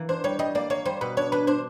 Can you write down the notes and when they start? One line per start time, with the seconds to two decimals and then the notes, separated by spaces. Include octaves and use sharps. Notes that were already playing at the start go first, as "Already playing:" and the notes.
Already playing: E3 A#3
0.09 D4 C5
0.24 G3 C#5
0.39 G3 D#5
0.55 A#3 D5
0.70 A#3 C#5
0.85 G3 C5
1.01 B2 B4
1.17 D4 C#5
1.32 D4 B4
1.47 D4 C5